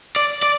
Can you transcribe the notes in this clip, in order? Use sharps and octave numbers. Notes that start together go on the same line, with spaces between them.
D5
D5